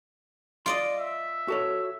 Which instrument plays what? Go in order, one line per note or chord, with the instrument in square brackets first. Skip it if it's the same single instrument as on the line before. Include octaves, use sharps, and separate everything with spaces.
[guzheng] F4 D5 D#5 [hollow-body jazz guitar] C6
[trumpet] E5
[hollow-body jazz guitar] F#4 A4 C#5